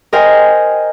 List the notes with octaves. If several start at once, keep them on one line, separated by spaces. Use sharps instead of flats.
A#4 C5 D#5 G5 G#5